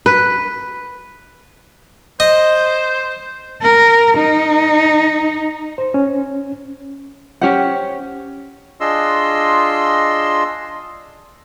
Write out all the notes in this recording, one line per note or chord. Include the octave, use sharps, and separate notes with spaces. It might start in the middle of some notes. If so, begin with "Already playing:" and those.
B4
C5 D#5
A#4
D#4
C5
C#4
C#4 G4 C5 F#5
D4 F4 G#4 D#5 C6 E6